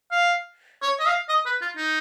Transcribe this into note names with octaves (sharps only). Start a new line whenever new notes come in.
F5
C#5
D#5
F5
D#5
B4
F4
D#4